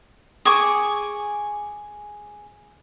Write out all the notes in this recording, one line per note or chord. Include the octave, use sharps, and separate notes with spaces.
G#4 G#5 C#6 D6